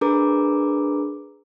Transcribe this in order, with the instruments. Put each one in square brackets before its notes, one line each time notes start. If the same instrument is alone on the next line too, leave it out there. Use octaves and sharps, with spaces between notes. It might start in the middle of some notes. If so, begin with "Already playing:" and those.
[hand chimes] D4 G#4 A#4 B4 A#5 D6